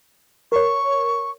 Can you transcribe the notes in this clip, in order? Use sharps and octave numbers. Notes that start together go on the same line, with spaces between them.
A#4 C#5 C#6